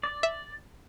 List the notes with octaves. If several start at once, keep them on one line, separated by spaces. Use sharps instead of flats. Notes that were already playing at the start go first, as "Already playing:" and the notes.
D5
E5